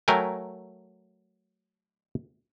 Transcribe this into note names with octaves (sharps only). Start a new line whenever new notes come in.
F#3 A3 A#4 G5 G#5